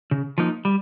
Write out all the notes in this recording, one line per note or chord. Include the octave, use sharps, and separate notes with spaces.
C#3
F3 A#3 D#4
G3